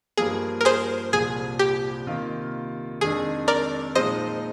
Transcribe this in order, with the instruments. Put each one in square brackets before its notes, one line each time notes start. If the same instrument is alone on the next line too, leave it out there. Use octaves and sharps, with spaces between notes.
[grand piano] G2 F3 A#3 [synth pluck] G#4
[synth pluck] A#4
G#4 C5
[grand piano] C2 A#2 F3 [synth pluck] G#4
[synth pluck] G4
[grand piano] C3 D#3 A#3 F4
[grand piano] F2 D#3 G#3 D4 [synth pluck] G#4
[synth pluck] A#4 D5
[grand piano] A#2 F3 G#3 D#4 [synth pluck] C5 D#5